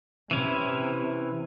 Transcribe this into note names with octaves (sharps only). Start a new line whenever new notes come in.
C3 E3 C#4 E4